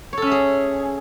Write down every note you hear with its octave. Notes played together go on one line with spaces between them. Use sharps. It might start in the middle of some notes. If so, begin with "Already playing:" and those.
C#4 G#4 A4 C#5 E5